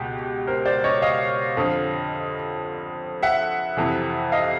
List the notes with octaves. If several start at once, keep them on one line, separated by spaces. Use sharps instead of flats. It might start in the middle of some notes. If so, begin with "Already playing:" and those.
Already playing: C#2 B2 G4
A#4 C5
C5 D5
C#5 D#5
D#5 F5
F2 D3 F3
E5 F#5
F2 C3 E3
D#5 F5